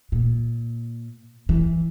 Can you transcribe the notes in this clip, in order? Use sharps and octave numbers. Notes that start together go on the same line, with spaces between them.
A#2
E3